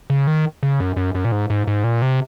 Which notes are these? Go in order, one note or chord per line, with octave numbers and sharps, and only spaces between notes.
C#3
D#3
C#3
F#2
F#2
F#2
A#2
G#2
G#2
G#2
A#2
C3